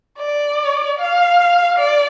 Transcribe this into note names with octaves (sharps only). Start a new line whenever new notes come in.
D5
F5
D5